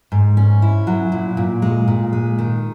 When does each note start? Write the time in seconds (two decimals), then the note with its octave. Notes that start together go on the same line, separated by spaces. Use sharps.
0.12 G#2
0.37 C#4
0.62 E4
0.87 F#3
1.12 A#2
1.37 A#2
1.62 G#3
1.88 A#2
2.13 G#3
2.39 D#3